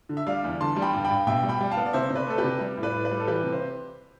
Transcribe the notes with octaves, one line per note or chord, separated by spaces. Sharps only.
D3
E5
G3 D5 F5
E2
D3 A5 C6
G3
G5 B5
G2
G5 B5
G2
B2 E5 G5
G3
G5 B5
G3
F5 A5
B3
D5
C3 C5 E5
C3
B4 D5
A3 A4
G4 B4
C3
G3
A2
B4 D5
A2
B4 D5
G3
A4
E3 G4 B4
C3
C5